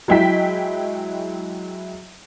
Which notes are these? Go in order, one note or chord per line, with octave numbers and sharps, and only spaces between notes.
F#3 G#3 E4 G5 B6